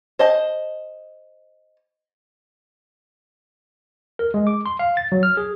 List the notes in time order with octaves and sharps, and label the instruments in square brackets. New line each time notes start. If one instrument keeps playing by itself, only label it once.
[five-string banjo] C5 D#5 A5
[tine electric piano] A#4
G#3
D6
C6
F5
A6
F#3
F6
G#4